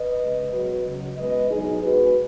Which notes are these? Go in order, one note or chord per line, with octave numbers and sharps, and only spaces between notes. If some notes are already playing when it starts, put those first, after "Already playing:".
Already playing: B4 D#5
C#3 G#3
B2 F#3 F#4 B4
C#3 F#3
B2 G#3 B4 D#5
B2 F#3 D#4 G#4
B2 G#3 F#4 B4